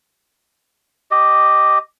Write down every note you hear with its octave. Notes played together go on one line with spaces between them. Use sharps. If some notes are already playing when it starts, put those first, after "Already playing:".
G4 D#5